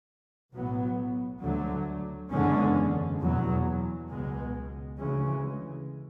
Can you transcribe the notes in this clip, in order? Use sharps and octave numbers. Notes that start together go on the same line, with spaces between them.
B1 A2 F#3 B3
D2 D3 F#3 A3
F#1 E2 D3 G#3 C#4
E2 B2 F#3
C#2 B2 G#3
D2 C#3 E3 G#3 C#4